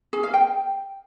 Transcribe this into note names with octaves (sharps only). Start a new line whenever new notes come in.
G#4
F5
G5